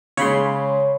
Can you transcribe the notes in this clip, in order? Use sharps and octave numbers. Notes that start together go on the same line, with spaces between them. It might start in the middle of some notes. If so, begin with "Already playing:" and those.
C#3 G#3 C#5 B5 C6